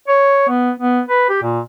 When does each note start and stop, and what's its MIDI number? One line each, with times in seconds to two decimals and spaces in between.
0.08 0.44 73
0.49 0.71 59
0.80 1.01 59
1.09 1.24 71
1.29 1.42 67
1.43 1.60 46